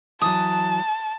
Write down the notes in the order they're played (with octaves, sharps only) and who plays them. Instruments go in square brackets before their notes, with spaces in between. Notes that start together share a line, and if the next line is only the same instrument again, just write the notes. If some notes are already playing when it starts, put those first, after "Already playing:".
[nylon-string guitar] E3 F#3 [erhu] A5 [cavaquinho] D#6